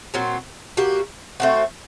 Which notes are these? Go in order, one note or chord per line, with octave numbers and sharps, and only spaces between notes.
A#2 F#3 C4
G3 A#3 F#4
A3 C4 F#4